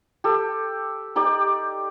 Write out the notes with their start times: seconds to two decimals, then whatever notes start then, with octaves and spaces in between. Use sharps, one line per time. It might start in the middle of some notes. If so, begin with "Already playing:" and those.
0.24 G4 A4
1.16 D#4 G4 D5